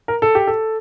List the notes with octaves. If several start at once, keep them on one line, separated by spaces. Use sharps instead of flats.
A#4
A4
G4
A4